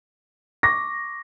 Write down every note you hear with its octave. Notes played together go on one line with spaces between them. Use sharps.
C#6 D6 A#6